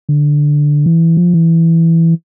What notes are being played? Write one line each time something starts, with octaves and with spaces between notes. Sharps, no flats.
D3
E3
F3
E3